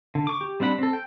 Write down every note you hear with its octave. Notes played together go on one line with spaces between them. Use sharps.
D3
C#6 D6
G4
G3 C4 D4 F#5 B5
C4 A4
G5